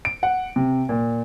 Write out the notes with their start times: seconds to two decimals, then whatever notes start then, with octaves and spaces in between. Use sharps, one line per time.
0.05 D7
0.23 F#5
0.56 C3
0.89 A#2